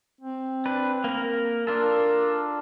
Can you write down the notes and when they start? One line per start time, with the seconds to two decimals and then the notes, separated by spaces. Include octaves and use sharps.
0.21 C4
0.66 D4 B4
1.04 A#3 A#4
1.67 D4 F4 A4 A#4